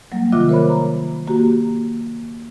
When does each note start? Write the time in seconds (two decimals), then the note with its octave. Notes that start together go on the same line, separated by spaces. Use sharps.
0.12 F#3 G3 A#3
0.32 C3 D#3 F4 E5 D6 F#6
0.49 A#4 C5 C#5 B5
0.69 A#5
1.27 A#3 F#4 G4